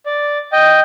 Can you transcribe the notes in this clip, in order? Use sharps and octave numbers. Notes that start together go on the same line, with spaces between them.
D5
D#5 G5